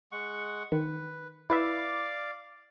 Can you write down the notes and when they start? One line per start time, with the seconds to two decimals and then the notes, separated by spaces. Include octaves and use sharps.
0.12 G#3 F#5 C#6
0.72 D#3 B4
1.50 E4 B4 D5 E5 F5 D6